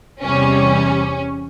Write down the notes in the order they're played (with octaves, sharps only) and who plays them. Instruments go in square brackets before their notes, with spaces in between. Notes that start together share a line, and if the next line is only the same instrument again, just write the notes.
[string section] E2 C3 E3 G3 C#4